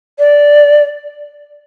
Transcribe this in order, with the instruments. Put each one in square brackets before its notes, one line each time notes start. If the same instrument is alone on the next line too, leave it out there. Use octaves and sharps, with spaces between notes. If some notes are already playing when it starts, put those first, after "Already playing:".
[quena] D5